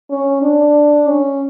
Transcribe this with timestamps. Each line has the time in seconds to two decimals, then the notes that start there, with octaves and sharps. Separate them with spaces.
0.10 C#4
0.42 D4
1.08 C#4